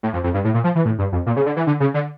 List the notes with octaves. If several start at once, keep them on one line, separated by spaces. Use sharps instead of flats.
A2
F2
F2
G2
A2
A#2
F3
E3
A2
G2
F2
A#2
C#3
D3
E3
D3
C#3
D3